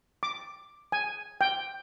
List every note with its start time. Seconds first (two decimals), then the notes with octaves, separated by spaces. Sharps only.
0.23 D6
0.92 G#5
1.41 G5